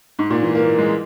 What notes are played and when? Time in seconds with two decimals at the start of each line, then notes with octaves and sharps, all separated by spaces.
0.19 G#2
0.30 A#2
0.43 E3
0.55 A#3
0.78 G#3